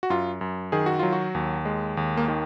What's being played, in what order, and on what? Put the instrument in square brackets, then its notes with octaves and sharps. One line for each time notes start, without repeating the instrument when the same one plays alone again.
[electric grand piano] F#4
F#2 F4
F#2
D#3 G#4
F#4
F#3 F4
F#4
D#2
G#3
D#2
A#3
D#3